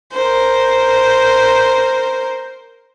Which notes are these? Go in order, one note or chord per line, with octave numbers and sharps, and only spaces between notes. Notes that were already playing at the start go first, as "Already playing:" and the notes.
A#4 C5